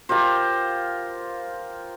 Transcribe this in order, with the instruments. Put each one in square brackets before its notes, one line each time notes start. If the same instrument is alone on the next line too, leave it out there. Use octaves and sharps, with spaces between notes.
[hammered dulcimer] F4 G4 A#4 C5